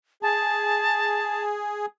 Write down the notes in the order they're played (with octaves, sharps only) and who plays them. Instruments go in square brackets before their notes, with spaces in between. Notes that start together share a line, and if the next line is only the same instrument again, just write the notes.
[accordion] G#4 [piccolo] A5